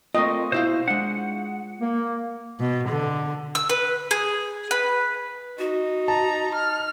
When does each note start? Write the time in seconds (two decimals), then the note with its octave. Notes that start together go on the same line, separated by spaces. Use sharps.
0.15 A3 A#3 C4 F4 D#5 C#6
0.52 B2 E4 C5 F5
0.88 G#3 D4 F#5
1.81 A#3
2.60 B2
2.89 D3
3.55 E6
3.70 B4
4.11 G#4
4.71 B4
5.59 D#4 F#4
6.08 A5 A#5
6.55 F6